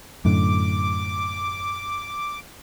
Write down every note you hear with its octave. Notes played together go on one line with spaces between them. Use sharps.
F#2 A2 D3 D6